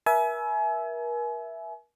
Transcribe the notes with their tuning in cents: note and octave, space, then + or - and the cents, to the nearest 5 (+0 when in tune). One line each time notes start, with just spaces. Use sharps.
A#4 +40 E5 +0 G#5 +35